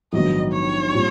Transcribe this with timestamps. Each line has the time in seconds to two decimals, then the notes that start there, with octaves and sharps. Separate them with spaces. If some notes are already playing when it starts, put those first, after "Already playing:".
0.13 A#1 G#2 D#3 F#3 B3 D#5
0.52 C#5
0.91 A#2 G3 C4